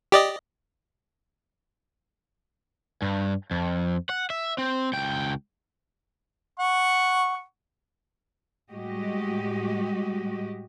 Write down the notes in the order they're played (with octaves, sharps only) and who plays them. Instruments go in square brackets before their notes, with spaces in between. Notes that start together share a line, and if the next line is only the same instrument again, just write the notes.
[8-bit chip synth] G4 D5 D#5
[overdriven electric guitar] G2
F2
F#5
E5
C4
C#2 G5
[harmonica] F#5 C#6
[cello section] A2 G3 G#3 F#4 G4 D#5